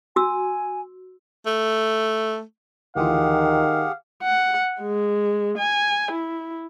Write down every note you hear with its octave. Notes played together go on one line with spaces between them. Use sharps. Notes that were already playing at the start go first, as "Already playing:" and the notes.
F#4 G#5 E6
A3
D2 D#3 E3 F4 G4 G#4 F5 F#5
F#5
G#3
G#5
E4